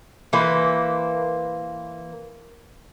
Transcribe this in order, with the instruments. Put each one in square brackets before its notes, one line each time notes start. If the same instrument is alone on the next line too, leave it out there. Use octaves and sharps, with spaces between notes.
[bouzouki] E3 A#3 B4 C5